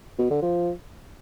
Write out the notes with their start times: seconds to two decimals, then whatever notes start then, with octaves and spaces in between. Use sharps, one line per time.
0.19 B2
0.30 D3
0.42 F3